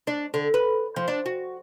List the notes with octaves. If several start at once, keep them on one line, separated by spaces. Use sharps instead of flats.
D4
D3
B4
F3
D4
F#4